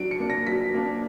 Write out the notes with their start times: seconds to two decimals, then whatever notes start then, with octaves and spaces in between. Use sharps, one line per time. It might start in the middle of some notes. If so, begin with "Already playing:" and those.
Already playing: F#3 D4 D7
0.11 C#7
0.20 A#3 D4
0.30 A#6
0.47 F#3 B6
0.74 A#3 D4